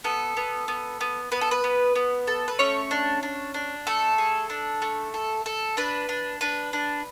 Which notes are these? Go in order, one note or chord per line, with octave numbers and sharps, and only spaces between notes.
B3 A4
B3
B3
B3
B3 B4
A4
B4
B3
B3
A4
B4
A3 C#4 C#5
D4
D4
D4
A3 A4
G#4
D4
A3
A4
A4
D4 B4
D4
D4 B4
D4